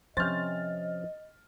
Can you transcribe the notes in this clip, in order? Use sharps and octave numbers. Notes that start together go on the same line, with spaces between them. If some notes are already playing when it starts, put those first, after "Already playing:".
C3 F3 C#4 C5 D#5 F6 A6